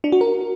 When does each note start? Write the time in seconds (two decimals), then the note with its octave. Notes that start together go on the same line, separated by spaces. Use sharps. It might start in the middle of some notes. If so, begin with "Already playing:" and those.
0.04 D4
0.12 F#4
0.21 A#4